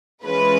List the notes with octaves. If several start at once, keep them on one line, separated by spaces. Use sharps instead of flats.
E3 G#3 C#4 F4 B4